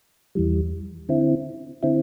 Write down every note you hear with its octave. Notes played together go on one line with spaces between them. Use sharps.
E2 E3 G3
D3 C4 E4
D3 C4 E4